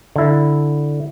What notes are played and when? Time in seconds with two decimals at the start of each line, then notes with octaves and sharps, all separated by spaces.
0.16 D3 E4